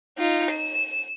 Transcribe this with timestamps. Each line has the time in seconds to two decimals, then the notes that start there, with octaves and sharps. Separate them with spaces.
0.18 D#4 F4
0.51 E7